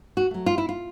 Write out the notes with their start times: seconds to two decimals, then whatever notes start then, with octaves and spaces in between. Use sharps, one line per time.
0.17 F#4
0.31 F#3 A3
0.46 F4
0.58 E4
0.69 F4